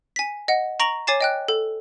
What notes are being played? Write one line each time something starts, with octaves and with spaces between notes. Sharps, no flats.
G#5 B6
D#5 F#5
A#5 C#6 A#6 D7 F7 F#7
C#5 G#5 D6 A6 C7 E7
D#5 G5 F#6
A4